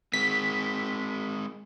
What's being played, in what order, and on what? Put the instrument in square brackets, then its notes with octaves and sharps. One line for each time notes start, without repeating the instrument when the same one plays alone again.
[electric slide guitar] G#3 C4 [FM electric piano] B6